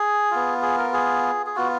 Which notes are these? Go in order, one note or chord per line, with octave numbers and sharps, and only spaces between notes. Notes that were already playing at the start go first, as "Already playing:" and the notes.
Already playing: G#4
B3 F4
G#4
A#4
G#4
G#4
B3 F4 F#4